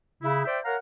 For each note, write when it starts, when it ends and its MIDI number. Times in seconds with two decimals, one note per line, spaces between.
0.22 0.44 49
0.22 0.44 64
0.45 0.59 72
0.45 0.59 74
0.45 0.59 76
0.45 0.59 79
0.64 0.76 70
0.64 0.76 73
0.64 0.76 77
0.64 0.76 78
0.64 0.76 82